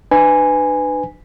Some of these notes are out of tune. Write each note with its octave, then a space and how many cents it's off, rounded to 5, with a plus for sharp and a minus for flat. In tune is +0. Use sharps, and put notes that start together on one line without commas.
D4 +40 B4 +20 G#5 -5